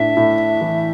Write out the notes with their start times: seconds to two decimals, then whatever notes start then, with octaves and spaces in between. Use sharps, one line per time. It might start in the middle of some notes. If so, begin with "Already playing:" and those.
Already playing: A2 D4 E5
0.17 A2
0.61 E3